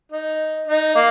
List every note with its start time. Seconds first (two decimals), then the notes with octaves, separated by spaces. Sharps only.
0.12 D#4
0.68 D#4
0.95 A#3